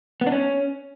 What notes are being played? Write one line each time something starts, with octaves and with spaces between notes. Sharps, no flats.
B3
D4
C#4